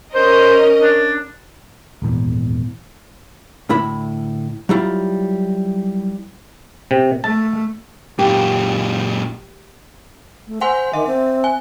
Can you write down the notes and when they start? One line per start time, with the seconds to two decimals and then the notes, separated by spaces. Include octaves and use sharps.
0.14 C#4 A#4 C5 D#5
0.82 D4
2.02 D#1 G#1 E2
3.69 D2 A2 E4 B5
4.69 F#3 G3 E4 F4
6.91 C3
7.24 A3 A5
8.19 F#2 A#2 G4
10.47 A3
10.61 C5 F#5 G#5 C6
10.93 D#3 E5
11.06 C4
11.44 G#5